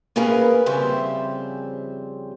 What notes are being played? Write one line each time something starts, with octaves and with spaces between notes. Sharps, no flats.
A#3 C#4 G#4 A#4 B4
F2 C#3 G3 C4 C5 E5